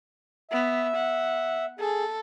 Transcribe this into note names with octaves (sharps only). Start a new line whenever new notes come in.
B3 E5
F#5
G#4 A4